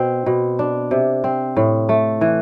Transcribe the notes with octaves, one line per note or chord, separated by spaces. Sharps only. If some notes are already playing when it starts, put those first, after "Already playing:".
Already playing: B2 C4
B2
D4
C3
C4
A2
A3
E3